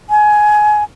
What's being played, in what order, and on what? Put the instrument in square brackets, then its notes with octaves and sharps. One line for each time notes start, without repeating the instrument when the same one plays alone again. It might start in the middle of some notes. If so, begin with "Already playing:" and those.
[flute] G#5